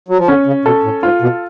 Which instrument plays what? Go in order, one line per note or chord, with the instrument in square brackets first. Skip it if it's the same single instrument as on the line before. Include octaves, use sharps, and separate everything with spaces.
[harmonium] F#3
F3
[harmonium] D3 [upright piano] C#4
[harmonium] C#3
[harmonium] B2 [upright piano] A4
[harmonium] A2
[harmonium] G#2 [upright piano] F4
[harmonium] B2